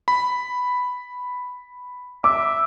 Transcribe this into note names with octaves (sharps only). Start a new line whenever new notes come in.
B5
E5 D6